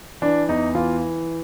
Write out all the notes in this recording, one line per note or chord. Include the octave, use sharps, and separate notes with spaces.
E3 D4
E2 D#4
E3 F4